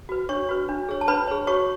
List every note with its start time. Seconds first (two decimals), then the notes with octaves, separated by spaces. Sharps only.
0.09 F#4 B4
0.29 D4 C#5 C#6
0.49 F#4 B4
0.69 D4
0.89 G#4 C#5
1.01 A5
1.08 D4 B4 B5
1.27 G#4 C#5
1.47 F#4 C#5 C#6